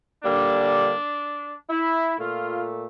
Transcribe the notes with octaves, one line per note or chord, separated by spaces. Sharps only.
D3 G3 A#3 D4
E4
A#2 A3 F4